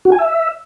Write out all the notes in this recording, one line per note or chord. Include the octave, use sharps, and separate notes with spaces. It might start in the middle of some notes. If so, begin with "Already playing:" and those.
F#4
G#5
E5